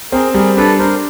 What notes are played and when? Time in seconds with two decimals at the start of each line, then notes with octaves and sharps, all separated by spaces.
0.12 C4 G#4 A#4
0.34 G3 G#4 A#4
0.57 D4 A4 B4
0.79 D4 A#4 C5